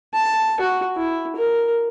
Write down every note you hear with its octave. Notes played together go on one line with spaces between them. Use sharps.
A5
F#4
E4
A#4